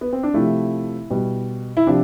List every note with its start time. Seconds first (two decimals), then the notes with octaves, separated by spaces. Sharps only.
0.01 B3
0.13 C4
0.23 D4
0.34 C3 F3 A3 E4
1.10 B2 G3
1.77 E4
1.87 C3 F3 D4